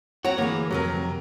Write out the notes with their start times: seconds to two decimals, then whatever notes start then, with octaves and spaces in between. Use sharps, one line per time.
0.25 C4 F#4 C#5 A#5
0.38 D2 E3 A#3 F#4 G#4
0.71 F2 C3 F#3 G4 A#4